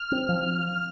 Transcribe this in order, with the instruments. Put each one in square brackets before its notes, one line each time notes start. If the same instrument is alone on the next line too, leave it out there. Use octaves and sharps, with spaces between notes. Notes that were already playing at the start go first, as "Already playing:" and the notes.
Already playing: [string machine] F6
[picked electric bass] C4
F3